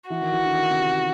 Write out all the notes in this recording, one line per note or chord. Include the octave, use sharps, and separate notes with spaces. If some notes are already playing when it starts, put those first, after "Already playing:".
E3 F#4
D#3
E3
D3
D#3
D3
C#3
C3